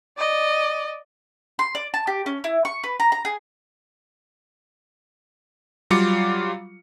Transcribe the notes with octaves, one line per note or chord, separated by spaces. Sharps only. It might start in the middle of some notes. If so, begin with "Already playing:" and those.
D5 D#5
C6
D5
A5
G4
C#4
E4
C#6
B4
A#5
A#5
G#4
F#3 G3 F4 F5 D6 C#7